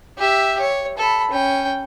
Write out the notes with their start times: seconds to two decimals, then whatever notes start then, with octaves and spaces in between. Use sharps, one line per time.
0.18 G4 E5
0.60 C#5
0.97 A4 B5
1.31 C#4 G5